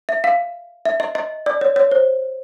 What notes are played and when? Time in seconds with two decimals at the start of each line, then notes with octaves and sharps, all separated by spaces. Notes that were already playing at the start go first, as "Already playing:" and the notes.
0.09 E5
0.24 F5
0.85 E5
1.00 D#5
1.15 D#5
1.46 D5
1.61 C#5
1.76 C#5
1.92 C5